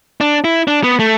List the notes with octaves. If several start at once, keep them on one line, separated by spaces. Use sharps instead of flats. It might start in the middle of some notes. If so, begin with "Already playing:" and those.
D4
E4
D4
B3
A3